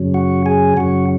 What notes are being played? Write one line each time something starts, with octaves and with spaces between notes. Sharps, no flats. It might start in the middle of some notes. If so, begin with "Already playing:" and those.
Already playing: F#2 C#3 F#3
F#4 F#5
G#4 G#5
F#2 C#3 F#3 F#4 F#5